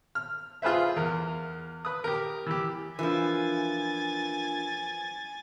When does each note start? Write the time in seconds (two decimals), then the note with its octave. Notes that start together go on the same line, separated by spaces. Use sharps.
0.15 F6
0.62 F4 G#4 B4 C5 E5
0.96 E2 A#4
1.85 B4 D#6
2.04 G4 A#4
2.47 E3 G4
2.99 E3 F3 D4 F4 A#4 G#5 A6